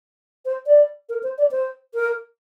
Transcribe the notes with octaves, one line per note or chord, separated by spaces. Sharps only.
C5
D5
A#4
C5
D5
C5
A#4